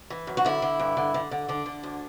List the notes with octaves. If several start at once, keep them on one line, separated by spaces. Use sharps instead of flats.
E3
F#2
F#4
D3 E4
D3
G2
D3
D3
D3
D3 D4
D3
D2